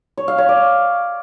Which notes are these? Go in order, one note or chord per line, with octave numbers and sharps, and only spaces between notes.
C#5
F5
C#5
D5